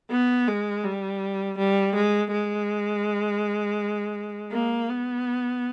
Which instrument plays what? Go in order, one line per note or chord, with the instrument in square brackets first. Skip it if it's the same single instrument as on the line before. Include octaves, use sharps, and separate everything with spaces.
[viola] B3
G#3
G3
G3
G#3
G#3
A#3
B3